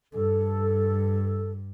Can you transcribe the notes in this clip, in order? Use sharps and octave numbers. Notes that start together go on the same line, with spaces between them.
G2 A4